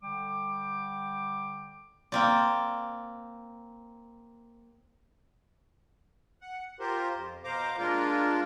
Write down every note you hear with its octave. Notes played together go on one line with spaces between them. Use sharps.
D3 G3 G5 D6
A#3 C4 D5
F#5
F4 G4 A#4 C5
F2
B2 C5 F5 A#5 D6
G#3 A#3 D4 F4 A#4